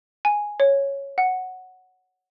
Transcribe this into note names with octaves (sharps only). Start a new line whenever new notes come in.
G#5
C#5
F#5